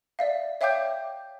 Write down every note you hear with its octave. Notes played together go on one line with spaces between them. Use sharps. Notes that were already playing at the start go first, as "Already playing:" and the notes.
D5 E5 F5
C#5 E5 F5 G5 D6 G6